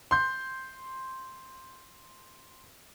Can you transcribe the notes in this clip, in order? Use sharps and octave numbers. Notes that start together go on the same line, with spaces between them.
C6 G6